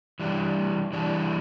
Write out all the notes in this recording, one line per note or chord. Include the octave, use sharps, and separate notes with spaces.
E3 G3 D4
E3 G3 D4